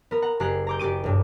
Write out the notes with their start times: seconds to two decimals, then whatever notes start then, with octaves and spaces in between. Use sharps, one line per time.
0.11 B3 A#4
0.22 F#5 A#5
0.40 F#1 G4 G#4 A#5 F#6 C7
0.67 A#5 D6 G6
0.79 F#1 F#4 G4 D6 D#7
1.04 B1 G2